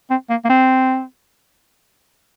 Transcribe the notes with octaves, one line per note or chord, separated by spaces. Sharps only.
C4
A#3
A#3
C4